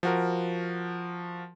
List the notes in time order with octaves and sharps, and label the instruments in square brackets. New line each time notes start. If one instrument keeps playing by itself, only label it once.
[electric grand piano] F3 F#4 A#4